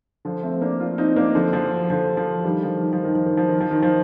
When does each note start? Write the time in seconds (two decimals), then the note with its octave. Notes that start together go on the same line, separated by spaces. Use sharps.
0.25 D3 F3
0.43 A3 C4
0.62 A#3 D4
0.80 D4 F4
0.98 C4 D#4
1.16 A#3 D4
1.35 D3 F3
1.53 D3 F3
1.90 D3 F3
2.17 D3 F3
2.45 D#3 G3
2.63 D3 F3
2.81 D#3
2.93 F3
3.04 D#3
3.15 F3
3.26 D#3
3.37 F3
3.49 D#3
3.61 F3
3.71 D#3
3.82 F3